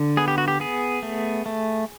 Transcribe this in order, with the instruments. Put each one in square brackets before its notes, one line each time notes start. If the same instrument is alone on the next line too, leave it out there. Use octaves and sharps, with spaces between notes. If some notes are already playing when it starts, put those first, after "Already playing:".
Already playing: [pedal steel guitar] D3
B3 G#4
G4
F#4
G4
B3 G#4
A3
A3